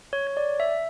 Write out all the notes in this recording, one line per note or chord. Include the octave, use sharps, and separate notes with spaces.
C#5
C#5
D5
E5